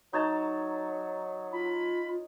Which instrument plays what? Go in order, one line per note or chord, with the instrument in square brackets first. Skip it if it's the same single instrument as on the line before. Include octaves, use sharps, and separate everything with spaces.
[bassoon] F#3 [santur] D#4 C#5 A5
[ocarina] F4 [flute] B5